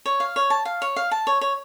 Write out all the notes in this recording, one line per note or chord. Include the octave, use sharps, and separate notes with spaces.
C#5
F5
C#5
A5
F5
C#5
F5
A5
C#5
C#5